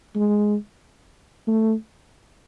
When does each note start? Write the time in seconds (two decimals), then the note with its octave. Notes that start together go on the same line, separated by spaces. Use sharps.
0.16 G#3
1.47 A3